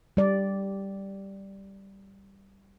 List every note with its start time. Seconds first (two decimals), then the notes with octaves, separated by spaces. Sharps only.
0.17 G3 D5